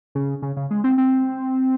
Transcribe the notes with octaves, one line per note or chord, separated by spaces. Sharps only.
C#3
C#3
C#3
G#3
C4
C4